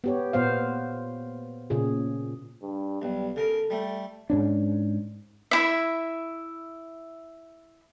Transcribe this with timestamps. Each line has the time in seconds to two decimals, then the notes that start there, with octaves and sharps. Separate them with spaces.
0.04 B3 G4 C#5
0.33 A#2 B3 C5 F5
1.70 A#2 C#3 G#4
2.62 G2
3.02 B1 G3
3.36 C#3 A4 A#4
3.70 G3 A3
4.30 G#2 C#4 D4
5.51 E4 E5